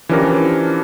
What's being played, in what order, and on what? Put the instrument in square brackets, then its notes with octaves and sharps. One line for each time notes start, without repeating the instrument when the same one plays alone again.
[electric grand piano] E3 F3 C#4 D4 G4 A#4